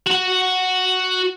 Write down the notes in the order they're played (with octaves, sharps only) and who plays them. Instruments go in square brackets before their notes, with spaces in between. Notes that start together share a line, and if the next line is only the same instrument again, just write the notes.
[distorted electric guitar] F#4 F#5